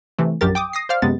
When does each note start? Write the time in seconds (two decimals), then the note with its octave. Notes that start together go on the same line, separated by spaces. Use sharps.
0.19 C3 E3 A3
0.41 A#1 F#2 F#3 G4 A#4 A6
0.55 G5 D6 D#6
0.73 D#6 A#6 C7
0.89 C5 D5 F5 F6
1.02 F#2 C3 G#3 B3 A6